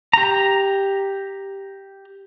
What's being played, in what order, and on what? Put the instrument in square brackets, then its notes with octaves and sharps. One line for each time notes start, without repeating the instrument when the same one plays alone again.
[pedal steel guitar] G4 A#5